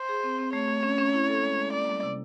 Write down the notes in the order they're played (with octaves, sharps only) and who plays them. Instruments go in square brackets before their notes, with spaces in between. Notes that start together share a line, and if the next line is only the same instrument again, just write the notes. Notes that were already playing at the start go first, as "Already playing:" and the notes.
Already playing: [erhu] C5
[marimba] G#4
C4
C4
[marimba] A3 [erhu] C#5
[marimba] A3
C#4
C#4
E4
A4
G#3
G#3
[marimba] A#3 [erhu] D5
[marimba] G3
C3